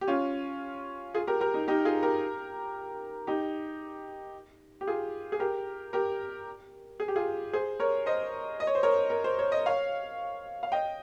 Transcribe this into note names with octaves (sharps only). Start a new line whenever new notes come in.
G4
C#4 F4
F4 G#4
G4 A#4
G4 A#4
D#4
D#4 G4
F4 G#4
G4 A#4
D#4 G4
G4
F4 G#4
G#4
G4 A#4
G4 A#4
G#4
G4
F4 G#4
G#4 C5
A#4 C#5
C5 D#5
D#5
C#5
C5
A#4 C#5
A#4
C5
C#5
D#5
C#5 F5
F5
D#5 G5